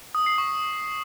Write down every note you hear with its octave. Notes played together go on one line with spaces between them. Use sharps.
D#6
C7
C#6